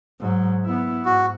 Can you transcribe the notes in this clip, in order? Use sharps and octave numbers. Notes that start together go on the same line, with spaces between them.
G#2 F#3
B3 E4
G#2 F#4